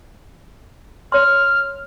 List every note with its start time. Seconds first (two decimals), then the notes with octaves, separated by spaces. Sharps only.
1.12 C#5 C6 F6